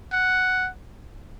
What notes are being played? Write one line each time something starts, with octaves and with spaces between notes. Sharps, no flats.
F#5